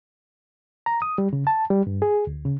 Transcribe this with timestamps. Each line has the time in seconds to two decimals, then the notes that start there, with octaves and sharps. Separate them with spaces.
0.86 A#5
1.02 D#6
1.18 G3
1.33 C#3
1.47 A5
1.70 G3
1.87 G2
2.02 G#4
2.27 D2
2.45 C#3